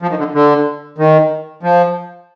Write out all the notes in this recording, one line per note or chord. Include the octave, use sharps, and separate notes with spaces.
F3
D#3
D3
D3
D#3
F3